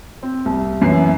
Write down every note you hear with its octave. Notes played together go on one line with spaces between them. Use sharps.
C4
C2
F#2 E3 C7